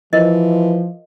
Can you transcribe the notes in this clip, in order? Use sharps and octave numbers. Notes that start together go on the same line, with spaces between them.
E3 F3 A#4 D#5